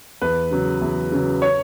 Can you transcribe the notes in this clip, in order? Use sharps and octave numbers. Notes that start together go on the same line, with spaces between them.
E2 B4
C#3 F#3
E2
C#3 F#3
C#5